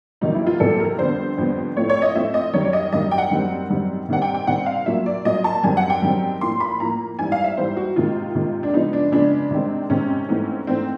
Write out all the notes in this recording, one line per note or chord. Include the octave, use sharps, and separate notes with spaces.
E2 C3 D#3 F#3 A#3 D#4
E4
F4
E2 C3 D#3 F#3 A#3 A4
A#4
F2 D3 G3 B3 C5
F2 D3 G3 B3
A2 F3 A3 C4 C#5
C#5
D#5
A2 F3 A3 C4 E5
D#5
F#2 D#3 G3 C#5
D5
D#5
F#2 D#3 G3 D#5
G5
F#5
F#2 D#3 G3 C4
F#2 D#3 G3 C4
C3 D#3 G3 C4 F#5
G5
G5
C3 D#3 G3 C4 F#5
F5
A#2 F#3 A#3 E5
D5
A#2 F#3 A#3 D#5
A5
F#2 D#3 G3 C4 G#5
F#5
G5
F#2 D#3 G3 C4
A2 F3 A#3 C6
B5
A2 F3 A#3 A#5
G#2 E3 G3 G#5
F5
E5
G#2 E3 G3 C5
F#4
C3 D#3 G#3 F4
C3 D#3 G#3
D4
C#3 F3 G#3 B3 D#4
D4
C#3 F3 G#3 B3 D4
C3 D#3 G#3 C4
C3 D#3 G#3 C4 C#4
G#2 E3 A3 C4
G#2 E3 A3 C4